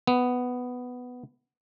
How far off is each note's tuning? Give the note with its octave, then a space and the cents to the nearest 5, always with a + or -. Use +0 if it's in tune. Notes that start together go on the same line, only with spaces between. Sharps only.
B3 +5